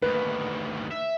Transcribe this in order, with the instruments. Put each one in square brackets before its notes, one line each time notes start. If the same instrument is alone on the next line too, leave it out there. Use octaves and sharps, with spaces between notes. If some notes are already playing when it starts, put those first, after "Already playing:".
[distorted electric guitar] D2 D#3 [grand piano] B4
[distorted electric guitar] E5